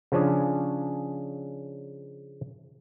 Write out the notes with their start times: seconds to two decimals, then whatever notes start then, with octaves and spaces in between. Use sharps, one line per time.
0.12 C#3 F3 C#4 D4 G#4